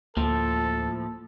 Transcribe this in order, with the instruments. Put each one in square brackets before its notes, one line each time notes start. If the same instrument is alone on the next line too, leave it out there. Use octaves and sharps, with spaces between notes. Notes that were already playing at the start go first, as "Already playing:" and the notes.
[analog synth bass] D2 [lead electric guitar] A2 F3 [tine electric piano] A#3 [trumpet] A4